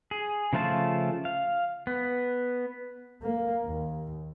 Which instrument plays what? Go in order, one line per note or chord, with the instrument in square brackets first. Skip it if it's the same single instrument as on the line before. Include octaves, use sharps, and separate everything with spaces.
[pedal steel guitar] G#4
C#3 F3 A3 F4 A5
F5
B3
[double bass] A#3
D#2